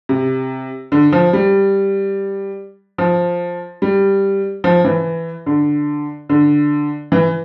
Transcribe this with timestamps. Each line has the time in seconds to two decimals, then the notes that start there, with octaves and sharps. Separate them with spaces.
0.09 C3
0.92 D3
1.12 F3
1.33 G3
2.98 F3
3.82 G3
4.64 F3
4.85 E3
5.46 D3
6.29 D3
7.12 E3